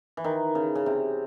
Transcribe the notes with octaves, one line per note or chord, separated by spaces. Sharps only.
E3
D#3
C#3
C#3
C3